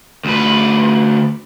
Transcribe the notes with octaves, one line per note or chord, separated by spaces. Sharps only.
D2 B4